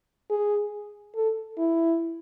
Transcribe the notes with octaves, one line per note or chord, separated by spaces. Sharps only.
G#4
A4
E4